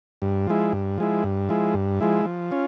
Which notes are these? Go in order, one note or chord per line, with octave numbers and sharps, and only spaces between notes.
G2
F3 G#3 E4
G2
F3 G#3 E4
G2
F3 G#3 E4
G2
F3 G#3 E4
F3
C#4 F4